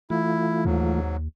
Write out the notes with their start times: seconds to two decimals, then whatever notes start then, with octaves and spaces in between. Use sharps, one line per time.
0.10 E3 A3 E4 F4
0.65 D#2 G#2 F#3